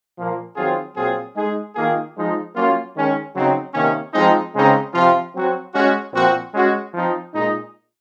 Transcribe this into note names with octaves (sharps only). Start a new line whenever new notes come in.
A#2 F3 A#3
D#3 F#3 C4 F4 G#4
A#2 F#3 C4 F4 G#4
G#3 D#4 G#4
D#3 A#3 F4 G#4
F3 G#3 D#4
F#3 A#3 C#4 F4
D#3 G#3 C#4
C#3 F#3 C4 D#4
C3 D#3 A#3 C#4
F3 G#3 C4 D#4
C#3 G#3 C4 D#4
C3 F3 C4 F4
F#3 C4 F#4
G#3 C#4 F#4
A#2 F3 C4 F#4
G#3 C#4 F#4
F3 C4 D#4
A#2 G#3 D#4